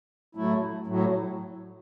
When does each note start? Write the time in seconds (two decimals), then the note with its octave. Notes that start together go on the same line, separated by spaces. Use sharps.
0.35 A2 F#3 A3 E4
0.87 A2 F#3